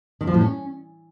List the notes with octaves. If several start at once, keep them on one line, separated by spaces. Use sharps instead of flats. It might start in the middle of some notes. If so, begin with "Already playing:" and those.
D#3
F3
A2
C#4